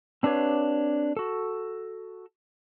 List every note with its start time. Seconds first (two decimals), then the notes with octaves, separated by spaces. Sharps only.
0.23 C4 D4 G4 B4 C#5 F5
1.17 F#4 A4